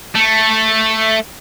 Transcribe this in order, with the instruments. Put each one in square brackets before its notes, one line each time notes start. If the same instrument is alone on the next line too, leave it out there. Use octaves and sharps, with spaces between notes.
[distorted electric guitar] A3